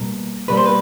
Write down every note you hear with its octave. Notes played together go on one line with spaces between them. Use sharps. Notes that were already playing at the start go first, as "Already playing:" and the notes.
Already playing: B2 G3 A#3
B2 G3 A#3 B4
C5
B4